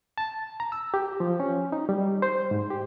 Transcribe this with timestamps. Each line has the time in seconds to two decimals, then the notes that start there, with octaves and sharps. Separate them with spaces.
0.18 A5
0.60 A#5
0.72 E6
0.94 G4
1.20 F3
1.40 C#4
1.72 D#4
1.89 G3
2.22 C5
2.51 G#2
2.71 G4